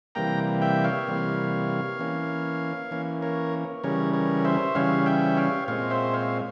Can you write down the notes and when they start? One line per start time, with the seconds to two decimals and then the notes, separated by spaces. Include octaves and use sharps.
0.15 C3 E3 G3 A#3 G5 A#5
0.61 E5 G5
0.84 C#5 F5
1.08 C3 E3 G3 A#3
1.99 E3 A#3 C#4
2.91 E3 A#3 C#4
3.22 A#4 C#5
3.84 C#3 E3 G3 C#4 A#4 C#5
4.14 A#4 C#5
4.45 C5 E5
4.75 C#3 E3 G3 C#4 C#5 F5
5.06 E5 G5
5.37 C#5 F5
5.68 A#2 G#3 C4 C#5 F5
5.90 C5 E5
6.13 C#5 F5